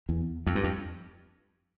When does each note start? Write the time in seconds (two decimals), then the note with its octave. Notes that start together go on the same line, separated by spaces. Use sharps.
0.09 E2
0.47 F2
0.55 G2
0.64 F2